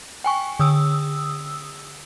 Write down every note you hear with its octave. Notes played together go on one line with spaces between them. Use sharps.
G5 G#5 C#6
D3 D#6 E6